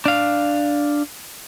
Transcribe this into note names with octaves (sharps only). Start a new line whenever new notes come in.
D4 F5